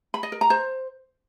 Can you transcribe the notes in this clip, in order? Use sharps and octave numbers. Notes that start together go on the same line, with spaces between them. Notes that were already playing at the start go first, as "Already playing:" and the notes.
B5
D#5
A#4
A#5
C5